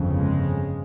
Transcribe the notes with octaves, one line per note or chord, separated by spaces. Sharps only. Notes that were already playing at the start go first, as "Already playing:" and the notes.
Already playing: G1 F2 C#3
G#3